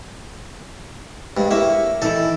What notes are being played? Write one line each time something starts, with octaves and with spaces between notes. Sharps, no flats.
G2 G#3
A#3 E4 C#5 E5
D#3 E3 E4 A4